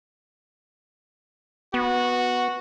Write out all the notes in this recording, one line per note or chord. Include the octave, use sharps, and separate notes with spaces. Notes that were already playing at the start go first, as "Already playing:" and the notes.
B3 F#4